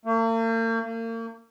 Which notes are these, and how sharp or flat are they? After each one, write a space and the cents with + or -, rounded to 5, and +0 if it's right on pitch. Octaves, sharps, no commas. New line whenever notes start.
A#3 -45
A#3 -40